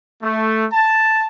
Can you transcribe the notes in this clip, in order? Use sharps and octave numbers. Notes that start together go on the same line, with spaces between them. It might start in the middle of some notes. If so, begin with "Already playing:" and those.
A3
A5